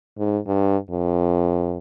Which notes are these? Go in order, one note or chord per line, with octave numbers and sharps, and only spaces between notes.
G#2
G2
F2